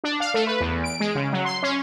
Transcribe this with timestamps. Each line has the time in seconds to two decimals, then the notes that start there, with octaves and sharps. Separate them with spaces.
0.04 D4
0.20 F5
0.34 A3
0.47 B4
0.60 E2
0.84 D7
1.00 G#3
1.15 C#3
1.32 F#3
1.45 C6
1.63 C#4